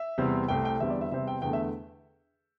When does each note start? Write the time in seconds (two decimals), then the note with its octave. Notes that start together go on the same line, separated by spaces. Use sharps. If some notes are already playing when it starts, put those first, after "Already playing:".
Already playing: E5
0.18 E2 C3 G3 C4
0.48 C2 C3 A3 G5
0.65 G5
0.80 E2 D3 G3 C4 E5
0.90 D5
1.01 E5
1.11 E2 C3 G3 C4 E5
1.27 G5
1.42 E2 D3 A3 G5
1.53 E5